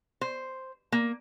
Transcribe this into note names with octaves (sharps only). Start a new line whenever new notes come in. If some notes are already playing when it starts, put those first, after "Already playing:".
C5
A#3